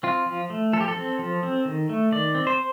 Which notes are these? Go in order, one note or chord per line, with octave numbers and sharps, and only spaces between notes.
C4 F4
F3
A3
F3 A4
G4
A4
C4
F3
C4
D#3
A3
D#3 D5
C4
C5